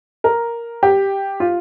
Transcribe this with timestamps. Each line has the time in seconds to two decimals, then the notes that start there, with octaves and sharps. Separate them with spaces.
0.24 A#4
0.83 G4
1.40 F4